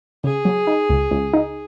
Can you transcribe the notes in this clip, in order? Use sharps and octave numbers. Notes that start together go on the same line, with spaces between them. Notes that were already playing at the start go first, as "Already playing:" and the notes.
C#3 G#4
F#3
D#4
C#2
C#2
D#4